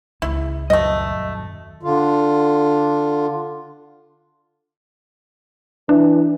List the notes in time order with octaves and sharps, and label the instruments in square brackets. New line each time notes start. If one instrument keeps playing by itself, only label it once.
[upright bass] C#2 [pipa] E4
[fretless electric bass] D#1 F#2 F#3 [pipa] A3 D#5
[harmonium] D3 F4
[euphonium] E3 [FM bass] D4